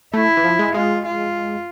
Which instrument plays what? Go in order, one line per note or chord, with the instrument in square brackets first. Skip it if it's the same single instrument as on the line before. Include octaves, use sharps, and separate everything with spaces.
[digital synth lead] A3 [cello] E4
[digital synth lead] E3
F3
G#3
[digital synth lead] G#3 [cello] F4
[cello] F4